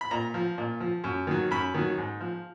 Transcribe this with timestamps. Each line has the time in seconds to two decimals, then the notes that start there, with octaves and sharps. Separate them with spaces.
0.01 B5
0.11 A#2 A#5
0.34 F3
0.58 A#2
0.80 F3
1.04 F#2
1.27 D#3 F#3
1.51 F#2 B5
1.74 D#3 F#3
1.98 G#2
2.20 F3